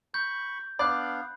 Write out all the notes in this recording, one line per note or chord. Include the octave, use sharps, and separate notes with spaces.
B5 C#6 G6
B3 D4 D5 F5 B5 F#6